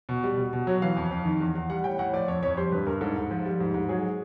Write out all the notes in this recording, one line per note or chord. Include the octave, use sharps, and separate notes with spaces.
B2
G3
B2
B2
F#3
E3 F5
F2
F2
D#3
E2
E2
G3 F#5
A2 G5
A2 F#5
F3 D5
F2 C#5
F2 C#5
G3 C5
G2 B4
G2 A#4
G#2 A4
G#2
F3
G3
G#2
G#2
F#3 G#4